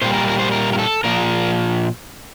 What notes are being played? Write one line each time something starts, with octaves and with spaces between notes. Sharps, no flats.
A#2 G3 C5
A#4
A#4
C5
A#4
A#4
A4
A#2 F3 A#4